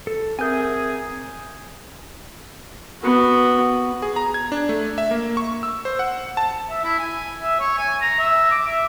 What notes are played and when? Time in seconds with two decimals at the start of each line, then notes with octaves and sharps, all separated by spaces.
0.07 A4
0.39 C4 G#4 A#4 E5 G#5 G6
3.02 B3 F#4
4.02 G#4
4.16 A#5
4.34 G#6
4.52 D4
4.69 A3
4.98 E5
5.11 A#3
5.37 C#6
5.63 E6
5.85 C5
5.99 F#5
6.37 A5
6.70 E5
6.84 E4
6.99 G#5
7.42 E5
7.60 C#5
7.78 G#5
8.01 A#5
8.19 E5
8.51 D6
8.67 E5